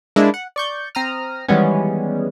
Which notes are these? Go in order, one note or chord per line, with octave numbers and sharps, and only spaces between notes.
G#3 A#3 D4 E4 C5
F#5
D5 C#6 G6
C4 A#5 D#6 F6
D#3 E3 G3 G#3 B3 C#4